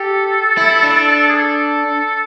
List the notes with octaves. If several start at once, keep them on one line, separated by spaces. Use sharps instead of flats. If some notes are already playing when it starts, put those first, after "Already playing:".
Already playing: G4 A4
E4
D4
G#4
A4